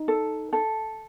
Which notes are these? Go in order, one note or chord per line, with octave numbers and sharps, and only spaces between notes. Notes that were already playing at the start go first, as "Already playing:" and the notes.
Already playing: D#4
A4
A4